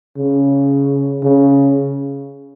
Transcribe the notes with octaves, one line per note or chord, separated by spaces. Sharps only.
C#3
C#3